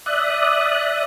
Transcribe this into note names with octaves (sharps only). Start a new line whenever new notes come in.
D5 E5 D#6 F#6